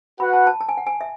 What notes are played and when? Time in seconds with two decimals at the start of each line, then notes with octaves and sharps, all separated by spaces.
0.20 F#4 B4 F#5 B5
0.33 A5
0.47 A5
0.61 A5
0.69 G#5
0.77 F#5
0.87 G#5
1.01 E5